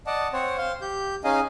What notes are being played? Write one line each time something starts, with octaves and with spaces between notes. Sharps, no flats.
D5 D#5 F#5 A5
C4 C5 C#5 F#5
C5 F5 C6
G4 G6
C#4 D#4 G#4 D#5 F5 G#5